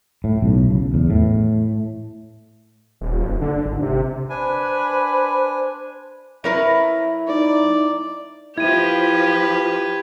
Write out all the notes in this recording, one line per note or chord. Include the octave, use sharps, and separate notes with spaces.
A2
B1
C#3
E2
A2
D#1
F#1
D3
G#1
C3
D4 B4 C5 G#5
F#3 E4 A#4 B4 E5
D#4 D5
F3 E4 G4 B4 G#6 D#7